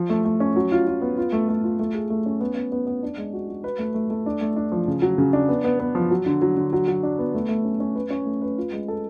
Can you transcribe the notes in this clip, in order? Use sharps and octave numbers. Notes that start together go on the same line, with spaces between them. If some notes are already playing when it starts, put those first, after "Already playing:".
Already playing: F3
A3
A3
C#4
F#3
F4
F4
B3
F4
A3
A3
F4
A3
G#4
A3
C#4
B3
B3
B3
B3
D4
G#3
F#4
F#4
B4
A3
A3
A3
D4
A3
D4
F3
C#3
F#3
C#3
D4
B3
B3
B3
F3
F#3
D3
F#3
D3
F#3
F#3
D4
B3
A3
A3
C#4
C#4
B4
C#4
A3
B4
F4
G#3
A4